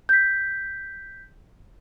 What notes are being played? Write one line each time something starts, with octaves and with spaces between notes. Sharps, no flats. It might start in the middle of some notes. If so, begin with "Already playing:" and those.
G6 B6